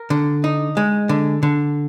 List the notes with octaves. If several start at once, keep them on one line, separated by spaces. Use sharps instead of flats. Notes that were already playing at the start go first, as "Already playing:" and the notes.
Already playing: A#4
D3
D#4
G#3
D3
D3